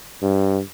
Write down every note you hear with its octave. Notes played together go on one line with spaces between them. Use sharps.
G2